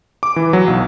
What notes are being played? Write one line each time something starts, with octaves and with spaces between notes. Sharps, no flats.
D6
E3
F#3
B1